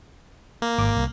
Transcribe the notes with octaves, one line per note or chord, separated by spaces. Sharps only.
A#3
G#1 D6
C2